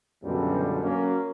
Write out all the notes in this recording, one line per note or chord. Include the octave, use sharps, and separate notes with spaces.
C#2 F#2 B2 D3 F#3 G3
F#3 A#3 C#4